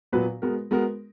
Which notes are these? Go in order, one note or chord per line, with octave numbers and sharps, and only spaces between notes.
A#2 F#3 B3 F#4 B4
G#3 B3 F#4 A#4
G#3 B3 F#4 A#4